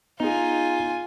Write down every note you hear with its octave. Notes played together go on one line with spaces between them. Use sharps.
B3 D#4 F4 G#4 G#5